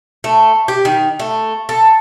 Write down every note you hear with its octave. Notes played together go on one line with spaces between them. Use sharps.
A3
G4
D#3
A3
A4